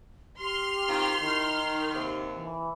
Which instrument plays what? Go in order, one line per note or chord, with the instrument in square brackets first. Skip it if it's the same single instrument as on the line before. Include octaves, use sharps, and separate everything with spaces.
[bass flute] G4 [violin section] C6 F6
[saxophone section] D#3 C4 F4
[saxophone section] D#3 [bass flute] E4
[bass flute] D#4
[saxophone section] D#2 C3
[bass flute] E3